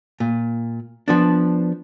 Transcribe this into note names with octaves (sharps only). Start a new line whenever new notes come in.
A#2
F3 B3 D4